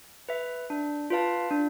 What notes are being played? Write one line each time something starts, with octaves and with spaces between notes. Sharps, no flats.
B4 E5
D4
F4 B4 F5 A5
D4